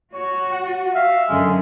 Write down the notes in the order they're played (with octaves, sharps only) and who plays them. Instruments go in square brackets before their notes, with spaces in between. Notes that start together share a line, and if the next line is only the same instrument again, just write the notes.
[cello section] F#4 [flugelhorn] C#5
[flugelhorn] F#5
[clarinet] E5 [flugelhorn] F5
[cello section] F#2 D3 [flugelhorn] G#3